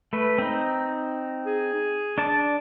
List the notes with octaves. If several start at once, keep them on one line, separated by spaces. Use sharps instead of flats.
A3 B4
C4 D#4
G#4
D4 D5 A5